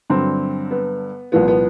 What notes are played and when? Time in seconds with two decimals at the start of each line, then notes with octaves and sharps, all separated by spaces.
0.10 G2 D3 F#3 C4
0.71 B3
1.32 C2 A#2 F3 B3
1.48 B3